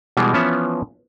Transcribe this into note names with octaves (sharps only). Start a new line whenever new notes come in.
B2 E3 G3 G#3
E3 F3 B3 C#4 E5 A#5